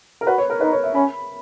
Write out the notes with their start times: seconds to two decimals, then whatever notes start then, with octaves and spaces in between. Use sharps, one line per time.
0.21 A#4
0.27 F#4 B4
0.38 C#5
0.50 A#4
0.61 D#4 B4
0.72 C#5
0.84 E5
0.94 C#4 B5